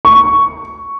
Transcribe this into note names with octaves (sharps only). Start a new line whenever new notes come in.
C#6